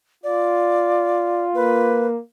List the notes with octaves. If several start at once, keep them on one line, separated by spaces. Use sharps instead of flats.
F4 D5
A#3 B4